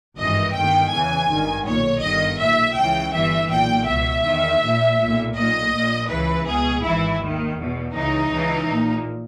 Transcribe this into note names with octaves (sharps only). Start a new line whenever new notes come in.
G#1 G2 E3 D#5
G1 G2 D#3 G5
E2 C#3 E3 G#5
G#1 G2 D#3
B1 A#2 C#5
G1 G2 D#3 D#5
B1 A#2 E5
C#2 C#3 E3 G5
G1 G2 E3 E5
B1 A#2 G5
C#2 B2 E5
E2 D#3
A#1 A#2
A#2
B1
B1 A#2 D#5
A#1 A#2
C#2 C#3 E3 B4
C#2 B2 G#4
G#1 G#2 E3 E4
D#2 D#3
E2 B2
C#2 C#3 E3 D#4
C#2 C#3 E3
A#1 A#2